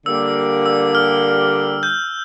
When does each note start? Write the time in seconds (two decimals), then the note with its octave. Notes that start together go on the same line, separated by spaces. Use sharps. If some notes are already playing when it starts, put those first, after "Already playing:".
0.06 D3 G3 A#3 D4 G4 E6
0.66 E6
0.95 F6
1.83 G6